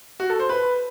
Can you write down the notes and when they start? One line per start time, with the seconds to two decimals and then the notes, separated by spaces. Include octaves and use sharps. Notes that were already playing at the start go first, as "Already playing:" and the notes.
0.20 F#4
0.30 A4
0.39 C5
0.49 B4